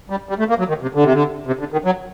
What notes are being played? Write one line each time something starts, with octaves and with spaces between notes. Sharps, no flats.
G3
G3
A3
A#3
F#3
D#3
C3
D3
C3
D3
C3
D3
D#3
F#3